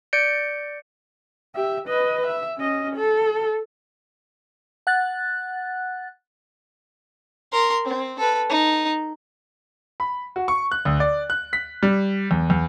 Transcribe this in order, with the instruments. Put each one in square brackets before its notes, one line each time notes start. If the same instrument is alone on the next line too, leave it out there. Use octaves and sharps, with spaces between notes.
[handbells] D5 G6 C#7 D7
[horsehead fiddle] G4 E5
B4 D#5
E5
C#4 D#5
A4
[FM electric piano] F#5 F#6 A6
[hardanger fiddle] A#4 C6
C4
A4 B4
D#4
[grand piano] B5
F#4
C#6
F#6
D2
D5
F#6
B6
G3
E2
E2